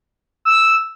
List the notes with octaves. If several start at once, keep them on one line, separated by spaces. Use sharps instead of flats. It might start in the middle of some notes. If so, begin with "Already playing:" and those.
E6